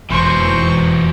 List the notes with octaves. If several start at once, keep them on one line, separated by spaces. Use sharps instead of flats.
E1 F2 E3 F#3 C5 C#6